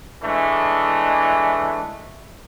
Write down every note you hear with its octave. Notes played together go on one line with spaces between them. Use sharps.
E3 G#3 A3 D4